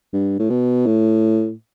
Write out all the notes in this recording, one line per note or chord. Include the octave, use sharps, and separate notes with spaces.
G2
A2
B2
A2